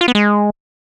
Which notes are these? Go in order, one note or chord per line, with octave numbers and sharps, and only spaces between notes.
F4
B3
G#3